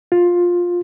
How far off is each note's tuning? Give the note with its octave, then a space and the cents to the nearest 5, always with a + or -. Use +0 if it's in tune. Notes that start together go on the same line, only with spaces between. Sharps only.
F4 +10